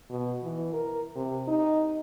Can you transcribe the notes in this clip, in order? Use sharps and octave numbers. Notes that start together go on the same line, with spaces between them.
B2
E3
A#4
C3
D#4